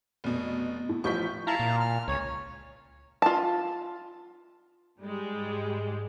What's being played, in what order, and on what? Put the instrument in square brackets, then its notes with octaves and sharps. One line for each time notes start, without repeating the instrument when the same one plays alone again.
[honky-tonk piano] F1 B2
[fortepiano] A2
[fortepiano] A1 F3 [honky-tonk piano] C#6 G6 B6
[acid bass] E4 [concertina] F5 A5 A#5
[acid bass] A#2
[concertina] F6
[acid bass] C#2 [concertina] C#5
[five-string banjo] F4 A5
[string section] G#2 G3 G#3